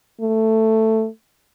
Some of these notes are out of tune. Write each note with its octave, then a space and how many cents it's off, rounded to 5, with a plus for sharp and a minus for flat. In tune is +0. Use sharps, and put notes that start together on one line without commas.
A3 +10